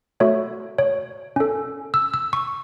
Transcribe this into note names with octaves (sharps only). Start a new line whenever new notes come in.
A3 F#4 A4 C#5
C#5
C#4 A4
E6
E6
C#6